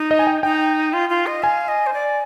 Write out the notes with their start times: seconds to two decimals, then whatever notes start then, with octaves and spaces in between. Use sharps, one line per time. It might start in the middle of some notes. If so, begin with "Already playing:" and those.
Already playing: D#4
0.11 D#5
0.19 G#5
0.27 G5
0.43 D#4 G5
0.93 F4
1.09 F4
1.27 D#5
1.43 F5 G#5
1.68 D#5
1.87 C5
1.93 D5